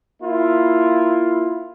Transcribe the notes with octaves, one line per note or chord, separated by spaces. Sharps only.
A#3 E4 F4